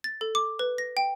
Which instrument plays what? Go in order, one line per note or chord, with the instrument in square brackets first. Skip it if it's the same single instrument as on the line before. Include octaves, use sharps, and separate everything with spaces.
[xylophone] A6
A4
D6
B4
A#6
G5